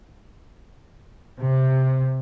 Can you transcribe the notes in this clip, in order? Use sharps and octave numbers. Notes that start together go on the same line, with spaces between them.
C3